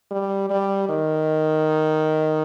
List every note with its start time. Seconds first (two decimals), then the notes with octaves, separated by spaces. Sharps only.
0.11 G3
0.50 G3
0.89 D#3